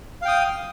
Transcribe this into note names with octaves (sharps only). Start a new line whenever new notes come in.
F5 G5 D#6